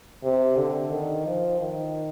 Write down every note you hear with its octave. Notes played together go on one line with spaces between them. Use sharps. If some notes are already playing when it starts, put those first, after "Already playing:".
C3
D3
D#3
F3
D#3